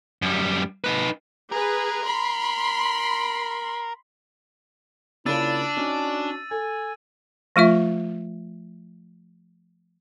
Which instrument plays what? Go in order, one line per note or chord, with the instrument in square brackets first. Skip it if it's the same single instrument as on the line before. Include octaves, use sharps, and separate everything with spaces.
[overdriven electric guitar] F#2 G3
D#4 B4
[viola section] G#4 B4 [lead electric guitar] A#4
[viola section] B5 C6
[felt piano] C#3 A#3 F4 [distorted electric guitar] D4 [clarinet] E4 [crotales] E6 A6 D#7
[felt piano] C#4 D#4 [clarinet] F#4
[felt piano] A4 [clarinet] G#5
[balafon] F3 A3 F4 E5